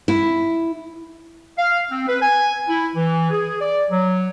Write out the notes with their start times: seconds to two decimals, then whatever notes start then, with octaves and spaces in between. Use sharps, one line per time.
0.08 E4
1.58 F5
1.91 C4
2.08 B4
2.22 G#5
2.69 E4
2.95 E3
3.31 G#4
3.61 D5
3.91 F#3